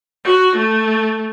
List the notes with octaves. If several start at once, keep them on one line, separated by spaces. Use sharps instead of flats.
F#4
A3